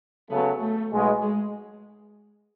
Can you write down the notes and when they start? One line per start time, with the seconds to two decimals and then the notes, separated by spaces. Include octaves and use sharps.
0.30 C#3 F#3 A3 B3
0.60 A3
0.91 B1 B2 G#3
1.22 G#3